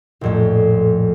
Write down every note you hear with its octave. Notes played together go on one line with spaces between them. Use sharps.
A#1 F2 A2